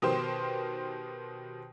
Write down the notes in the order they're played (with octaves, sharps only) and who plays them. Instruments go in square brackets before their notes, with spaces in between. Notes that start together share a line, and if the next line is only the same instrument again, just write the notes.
[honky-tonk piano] B2 D#3 G4 C5